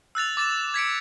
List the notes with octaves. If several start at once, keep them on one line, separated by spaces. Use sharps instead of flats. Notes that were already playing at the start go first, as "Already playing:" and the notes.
E6 F#6 A6 F7
D6 A6 E7
G#6 B6 C#7 D7